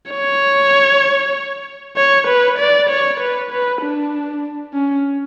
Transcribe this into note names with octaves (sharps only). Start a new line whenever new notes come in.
C#5
C#5
B4
D5
C#5
B4
B4
D4
C#4